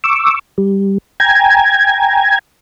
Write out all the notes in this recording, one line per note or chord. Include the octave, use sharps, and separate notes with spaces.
C#6 D6 E6
G3
G5 G#5 A#5 G#6